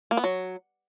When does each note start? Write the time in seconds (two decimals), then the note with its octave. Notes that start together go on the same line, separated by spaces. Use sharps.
0.11 A#3
0.17 B3
0.24 F#3